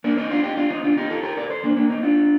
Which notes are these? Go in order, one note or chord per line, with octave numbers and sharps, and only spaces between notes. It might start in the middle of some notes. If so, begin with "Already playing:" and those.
A#3 D4
C4 D#4
D4 F4
D#4 G4
D4 F4
C4 D#4
D4 F4
D#4 G4
F4 A4
G4 A#4
A#4 D5
A4 C5
A#3 D4
A#3 D4
C4 D#4
D4 F4